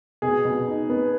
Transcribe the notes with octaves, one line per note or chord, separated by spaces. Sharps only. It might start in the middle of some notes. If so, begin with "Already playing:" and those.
B2 G#4
B2
D#4
B3